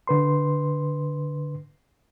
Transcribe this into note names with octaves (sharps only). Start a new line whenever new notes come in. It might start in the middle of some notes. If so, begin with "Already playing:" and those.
D3 B4 C6